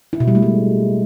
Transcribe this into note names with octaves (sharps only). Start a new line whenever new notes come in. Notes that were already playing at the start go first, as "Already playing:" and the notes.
E4
B2
G3
A3
G#3